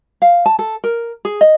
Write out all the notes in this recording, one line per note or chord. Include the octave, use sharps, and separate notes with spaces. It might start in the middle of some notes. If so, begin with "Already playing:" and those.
F5
A5
A4
A#4
G#4
D#5